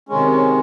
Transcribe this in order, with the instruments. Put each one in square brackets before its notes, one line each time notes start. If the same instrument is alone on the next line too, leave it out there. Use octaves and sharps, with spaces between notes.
[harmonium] C3 D#3 G#3 C#4
C#4